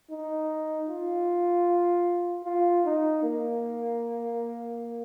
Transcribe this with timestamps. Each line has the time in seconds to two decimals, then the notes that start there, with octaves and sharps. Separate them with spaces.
0.11 D#4
0.88 F4
2.45 F4
2.85 D#4
3.23 A#3